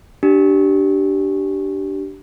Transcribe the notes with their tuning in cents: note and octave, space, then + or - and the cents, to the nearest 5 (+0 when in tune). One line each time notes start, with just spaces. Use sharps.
D4 +0 G4 -25